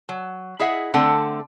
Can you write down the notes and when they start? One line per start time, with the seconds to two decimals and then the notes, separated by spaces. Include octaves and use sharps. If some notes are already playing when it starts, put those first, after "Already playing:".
0.09 F#3
0.59 E4 G#4 D#5 E5 F#5
0.94 D3 A3 C4 A4 F#5